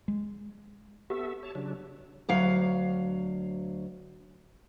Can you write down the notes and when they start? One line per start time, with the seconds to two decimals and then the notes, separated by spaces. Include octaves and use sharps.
0.08 G#3
1.10 B3 G4 A4 E5
1.43 C#5 A5
1.55 C#3 F#3 D4
2.29 D2 F#3 F5